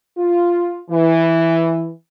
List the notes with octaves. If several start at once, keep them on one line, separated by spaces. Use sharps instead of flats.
F4
E3